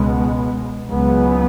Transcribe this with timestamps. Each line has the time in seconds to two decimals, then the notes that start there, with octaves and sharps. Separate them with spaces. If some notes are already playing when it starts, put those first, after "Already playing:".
Already playing: C#2 B2 G#3 B3
0.89 C#2 C#3 F#3 B3